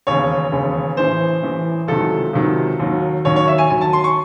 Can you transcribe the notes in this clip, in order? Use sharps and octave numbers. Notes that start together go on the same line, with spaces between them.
E1 D#2 C#3 C#5
E1 D#2 C#3
A1 A2 E3 C5
A1 A2 E3
C#2 C3 D#3 F#3 A4
C#2 C3 D#3 F#3
D#2 D#3 F#3
D#2 D#3 F#3 C#5
C#5
E5
G#5
D#2 D#3 F#3 G#5
A5
C6
C#6